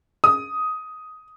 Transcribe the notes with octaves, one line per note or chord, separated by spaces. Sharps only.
D#6